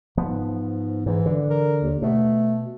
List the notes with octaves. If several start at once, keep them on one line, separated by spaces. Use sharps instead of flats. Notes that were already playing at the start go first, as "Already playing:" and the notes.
G#2 F3 B3
G#2 E3
D3
A#4
D#2
B2 A3